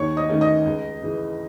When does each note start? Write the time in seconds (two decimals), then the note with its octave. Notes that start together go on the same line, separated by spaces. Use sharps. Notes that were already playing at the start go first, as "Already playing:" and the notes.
Already playing: D#2 C#5 C#6
0.17 D#5 D#6
0.29 D#3 A3 C#4
0.41 D#5 D#6
0.65 C#2
1.02 C#3 E3